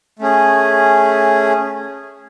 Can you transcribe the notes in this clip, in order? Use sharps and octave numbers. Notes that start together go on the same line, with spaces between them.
A3 C#4 G#4